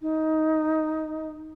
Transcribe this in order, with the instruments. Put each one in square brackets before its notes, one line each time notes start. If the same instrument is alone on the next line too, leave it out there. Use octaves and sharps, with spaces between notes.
[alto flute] D#4